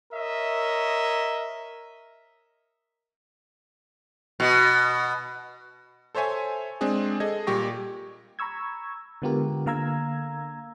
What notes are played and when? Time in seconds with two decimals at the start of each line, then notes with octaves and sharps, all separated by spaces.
0.12 A#4 C#5 D#5 E5
4.40 B2
6.15 A4 C5 C#5 E5 G#5
6.81 G#3 C4 D4 G#4
7.20 G#4 A4 D#5 G#6
7.47 A#2 G3 G4 C#6 A#6
8.39 A#5 B5 C#6 E6 G#6
9.22 D3 G#3 B3 F4 G4 A#4
9.66 D3 A#3 F5 A#5 E6 G#6